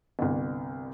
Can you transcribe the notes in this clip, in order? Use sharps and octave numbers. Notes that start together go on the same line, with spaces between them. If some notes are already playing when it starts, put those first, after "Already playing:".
G1 C2